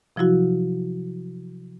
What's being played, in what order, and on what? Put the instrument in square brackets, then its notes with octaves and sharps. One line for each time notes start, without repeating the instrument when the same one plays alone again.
[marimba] C3 F3 F#3 E4 F#4